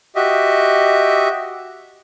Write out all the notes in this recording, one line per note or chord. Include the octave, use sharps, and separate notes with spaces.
F#4 G4 D#5 E5